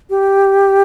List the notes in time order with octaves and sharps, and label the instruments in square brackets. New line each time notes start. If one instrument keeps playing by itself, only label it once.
[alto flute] G4